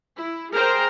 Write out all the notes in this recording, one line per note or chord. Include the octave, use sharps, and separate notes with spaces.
E4
G#4 A#4 C5 G5 A#5